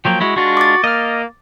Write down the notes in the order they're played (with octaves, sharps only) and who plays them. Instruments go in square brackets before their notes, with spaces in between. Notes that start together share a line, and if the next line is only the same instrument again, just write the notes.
[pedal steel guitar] F3 F#3 A#3 [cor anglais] G5
[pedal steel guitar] G#3 E4 [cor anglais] F#4
[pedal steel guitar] G#3 D4 F4 [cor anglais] F#4
[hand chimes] D6 A6
[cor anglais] A#3 [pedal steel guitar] D#5 F6